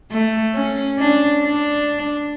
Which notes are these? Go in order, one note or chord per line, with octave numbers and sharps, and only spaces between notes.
A3
C#4
D4
D4